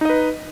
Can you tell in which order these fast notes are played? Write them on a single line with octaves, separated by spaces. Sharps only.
D#4 D#5 B4